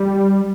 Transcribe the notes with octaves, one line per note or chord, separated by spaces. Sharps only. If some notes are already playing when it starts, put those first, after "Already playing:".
Already playing: G3